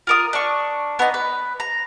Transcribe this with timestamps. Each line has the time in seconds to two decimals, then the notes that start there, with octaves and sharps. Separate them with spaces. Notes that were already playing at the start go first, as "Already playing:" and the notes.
0.07 F4 A#4 D#6
0.33 D4 C#6
0.99 B3 D#4 D#5
1.14 B4
1.60 A#5